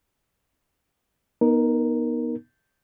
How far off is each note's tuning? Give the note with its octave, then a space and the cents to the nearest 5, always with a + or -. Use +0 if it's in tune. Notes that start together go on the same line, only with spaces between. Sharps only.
B3 -30 D#4 +0 A#4 +0